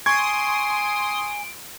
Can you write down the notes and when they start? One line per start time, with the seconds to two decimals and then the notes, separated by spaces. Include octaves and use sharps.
0.06 G#5 C6 C#6 D#6 G#6 D7